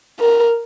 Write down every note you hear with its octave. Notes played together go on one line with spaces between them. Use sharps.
A#4